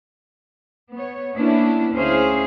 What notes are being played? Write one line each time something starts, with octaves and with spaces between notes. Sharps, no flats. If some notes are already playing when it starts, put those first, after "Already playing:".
B3 C#5
A#3 B3 C#4 D4 E4
D2 C#4 E4 G#4 C5 F5